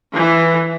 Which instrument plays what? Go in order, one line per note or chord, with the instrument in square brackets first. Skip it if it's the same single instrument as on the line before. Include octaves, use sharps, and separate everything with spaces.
[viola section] E3